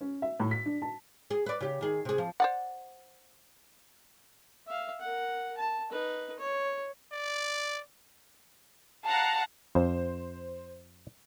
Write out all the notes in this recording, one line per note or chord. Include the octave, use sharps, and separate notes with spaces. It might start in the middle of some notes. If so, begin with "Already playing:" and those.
C#4
E5
A2
B6
D4
A5
G#4
B4 D5
C#3 G4
D#3 G#4
C3 G#4
F3
C5 D5 F#5
E5 F5
A#4 F#5
A5
D#4 B4
C#5
D5
F5 F#5 A5 A#5
F2 C5